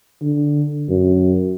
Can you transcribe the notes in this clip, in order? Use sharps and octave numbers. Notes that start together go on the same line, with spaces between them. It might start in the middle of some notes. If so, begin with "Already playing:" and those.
D3
F#2